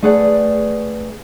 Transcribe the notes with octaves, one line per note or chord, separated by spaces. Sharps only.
A3 G#4 B4 D5 F#5